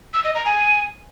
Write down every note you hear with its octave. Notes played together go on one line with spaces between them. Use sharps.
E6
D#5
A#5
G#5